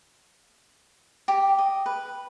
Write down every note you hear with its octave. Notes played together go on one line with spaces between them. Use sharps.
G4
D#5
B4